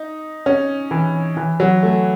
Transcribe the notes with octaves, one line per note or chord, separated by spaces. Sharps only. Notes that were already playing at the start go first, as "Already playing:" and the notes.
Already playing: D#4
C#4
E3
E3
F#3
A3